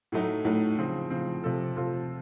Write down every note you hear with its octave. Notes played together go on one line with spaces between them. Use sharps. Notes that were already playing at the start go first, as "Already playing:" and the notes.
A2 F#3 A3 D#4
A2 F#3 A3 D#4
C#3 F3 C4
C#3 F3 C4
C3 F3 C4 F4 A4
C3 F3 C4 F4 A4